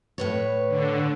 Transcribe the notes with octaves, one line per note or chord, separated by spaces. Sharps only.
A2 B4 C#5
D3